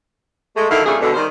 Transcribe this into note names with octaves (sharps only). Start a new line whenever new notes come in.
G#3 A3
D3 D#3 F#3 D#4 E4 F5
F2 C#3 G3 A3 G#4
B2 D3
D#3 G3 A#4 C5